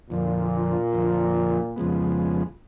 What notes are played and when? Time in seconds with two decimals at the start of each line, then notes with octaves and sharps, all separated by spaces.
0.10 F2 A#2 D3 F3
0.93 F2 D3 F3
1.76 F2 C#3 F3 G#3 B3